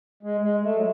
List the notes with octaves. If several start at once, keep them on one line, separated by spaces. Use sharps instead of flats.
G#3
G#3
A3
F#3